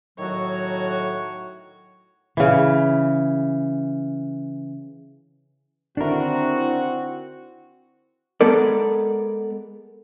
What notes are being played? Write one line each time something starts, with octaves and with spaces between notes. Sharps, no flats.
A2 D#3 F#3 F#4 C#5
C#3 E3
D3 D#3 C4 D4 E4 F#4 A#4
G#3 B3 A4 A#4 D5